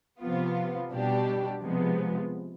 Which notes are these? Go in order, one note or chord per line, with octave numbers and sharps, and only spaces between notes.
C3 F3 B3 F4
B2 G3 D4 G4
C3 F3 G#3 B3